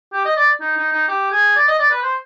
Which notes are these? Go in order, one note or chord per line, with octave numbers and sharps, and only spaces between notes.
G4
D#5
D5
D#4
D#4
D#4
G4
G#4
D5
D#5
D5
B4
C5